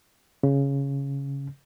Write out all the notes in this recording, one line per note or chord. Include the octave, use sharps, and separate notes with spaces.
C#3